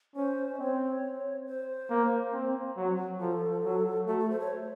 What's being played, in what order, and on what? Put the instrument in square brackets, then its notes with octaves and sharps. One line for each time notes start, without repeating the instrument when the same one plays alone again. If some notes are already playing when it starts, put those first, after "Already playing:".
[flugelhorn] C#4 [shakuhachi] C5
[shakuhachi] D#5
[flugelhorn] C4 [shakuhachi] C#5
[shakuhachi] C5
[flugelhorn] A#3
C4
F#3
[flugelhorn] F3 [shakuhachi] A4
[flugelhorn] F#3
[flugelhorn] A3 [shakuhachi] F#4
[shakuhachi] A4
C5
C#5